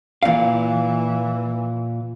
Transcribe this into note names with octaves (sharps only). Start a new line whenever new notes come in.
A#2 E3 F5